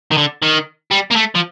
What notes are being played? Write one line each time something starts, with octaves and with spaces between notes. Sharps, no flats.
D#3
D3
D#3
G3
A#3
A3
F3